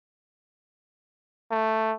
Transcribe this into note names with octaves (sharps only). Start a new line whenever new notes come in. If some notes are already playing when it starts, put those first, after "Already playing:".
A3